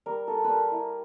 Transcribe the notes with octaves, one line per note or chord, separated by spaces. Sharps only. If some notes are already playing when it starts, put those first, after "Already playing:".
G3 A#4
G3 A4
G3 A#4 B4
E4